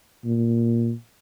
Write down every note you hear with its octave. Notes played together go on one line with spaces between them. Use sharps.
A#2